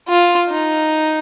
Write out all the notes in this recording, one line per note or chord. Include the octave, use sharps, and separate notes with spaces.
F4
D#4